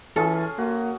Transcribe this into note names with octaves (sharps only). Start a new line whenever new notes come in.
E3 C#4 F4 G#4 A4
A#3 F#4